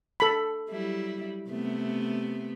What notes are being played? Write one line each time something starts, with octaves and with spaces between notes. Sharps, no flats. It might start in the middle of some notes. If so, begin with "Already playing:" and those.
A4 B5
F#3 G3 E4
C3 A3 B3